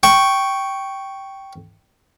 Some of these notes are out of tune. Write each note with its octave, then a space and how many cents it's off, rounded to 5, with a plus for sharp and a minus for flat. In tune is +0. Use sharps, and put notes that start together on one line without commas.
G5 -10 C#6 +0